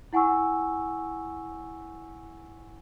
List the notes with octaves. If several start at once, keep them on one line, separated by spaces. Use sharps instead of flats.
E4 F#5 G#5 C#6 E6